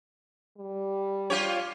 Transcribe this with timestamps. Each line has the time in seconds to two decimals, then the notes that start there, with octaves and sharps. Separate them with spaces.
0.58 G3
1.30 F4 G4 C#5